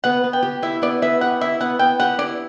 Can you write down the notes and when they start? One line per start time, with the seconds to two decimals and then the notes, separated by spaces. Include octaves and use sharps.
0.04 B3 F#5
0.24 B3
0.33 G5
0.43 G4
0.62 E4 E5
0.82 B3 D5
1.02 B3 E5
1.21 G4 F#5
1.41 E4 E5
1.60 B3 F#5
1.79 B3 G5
2.00 G4 F#5
2.18 E4 D5